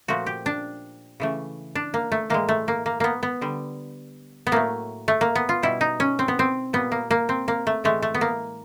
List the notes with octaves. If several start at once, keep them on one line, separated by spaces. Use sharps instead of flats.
A#2 F3 A3 F#4
G4
D4
C#3 E3 A3
D4
A#3
A3
A2 E3 G#3 A#3
A3
A#3
A#3
A#3 B3
B3
D3 G3
B3
A2 F#3 A3 A#3
A3
A#3
B3
F4
B2 G3 E4
D#4
C#4
C4
B3
C4
A#2 G3 B3
A#3
A#3
C4
A#3
A3
A2 E3 G#3 A3
A3
B3
A#3